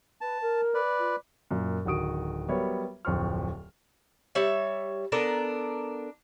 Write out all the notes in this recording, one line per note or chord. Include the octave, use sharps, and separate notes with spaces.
B4 A5
A#4
B4 D5
F4
F#2 A#2
D1 D#3 F#4 D#6 D7
F#3 G3 B3 A#4 C#5 E5
D1 F2 C5 C6 C#6 F6
G3 C#5 E5
B3 D4 A4 A#4